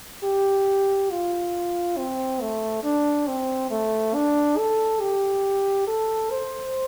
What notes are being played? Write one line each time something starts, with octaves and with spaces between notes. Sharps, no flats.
G4
F4
C4
A3
D4
C4
A3
D4
A4
G4
A4
C5